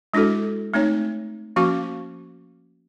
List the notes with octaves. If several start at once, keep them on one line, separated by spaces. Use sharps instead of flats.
G#3 D4 E4 F#4 A4
A3 C4 D#4 C#5
F3 A#3 C#4 F#4 F5